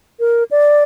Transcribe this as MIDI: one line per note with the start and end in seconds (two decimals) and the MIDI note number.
0.20 0.44 70
0.51 0.84 74